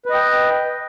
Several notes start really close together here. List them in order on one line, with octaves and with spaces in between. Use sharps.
B4 D#5 G5